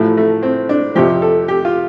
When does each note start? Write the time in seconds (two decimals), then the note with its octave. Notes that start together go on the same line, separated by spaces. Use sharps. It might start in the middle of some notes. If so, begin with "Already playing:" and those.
Already playing: A1 A2 F3 A3
0.17 A3
0.43 C4
0.69 D4
0.95 F2 C3 F3 G4
1.22 A4
1.48 G4
1.65 F4